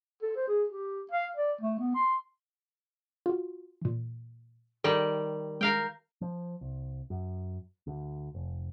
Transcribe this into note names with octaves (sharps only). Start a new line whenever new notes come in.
A4
C5
G#4
G4
F5
D5
A3
B3
C6
F4 F#4
A#2 E3
D#3 G3 G4 A4 D7
G#3 A#4 F5 G5
F3
C2
F#2
D2
F1